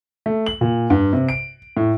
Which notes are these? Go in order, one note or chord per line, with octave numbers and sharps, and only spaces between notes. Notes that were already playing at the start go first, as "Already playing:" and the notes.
A3
F#7
A#2
G2
C3
D7
A2